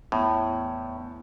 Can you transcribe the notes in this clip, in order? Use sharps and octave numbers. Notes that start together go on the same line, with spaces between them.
E2 A2